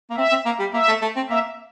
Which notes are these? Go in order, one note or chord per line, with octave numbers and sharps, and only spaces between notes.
A#3
C4 E5
C4
A#3
G3
A#3 E5
A3
A3
C4
A#3 E5